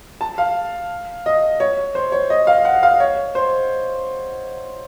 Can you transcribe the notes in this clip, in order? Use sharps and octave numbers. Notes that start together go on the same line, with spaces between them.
A5
F5
D#5
C#5
C5
C#5
D#5
F5
F#5
F5
C#5
C5